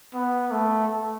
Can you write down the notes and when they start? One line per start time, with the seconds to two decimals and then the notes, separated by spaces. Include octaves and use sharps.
0.14 B3
0.51 A3